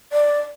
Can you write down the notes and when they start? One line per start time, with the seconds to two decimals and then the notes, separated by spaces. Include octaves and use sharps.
0.12 D5